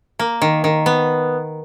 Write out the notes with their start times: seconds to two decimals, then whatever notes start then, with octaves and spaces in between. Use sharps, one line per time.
0.19 A#3
0.42 D#3
0.64 D#3
0.86 B3